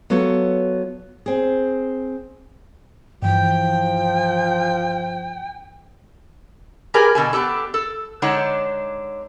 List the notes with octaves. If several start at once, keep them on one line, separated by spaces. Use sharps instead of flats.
F#3 B3 F4 A4 C#5
C4 G#4
G2 E3 F3 G5
G4 G#4 A#4 B4 D5 G#5
B2 D3 G#5
B3 D4 G4 A4
A4
D3 G#3 D4 D#4 C#5 F#5